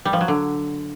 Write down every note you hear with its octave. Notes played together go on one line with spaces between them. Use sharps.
G3
F3
F#3
D3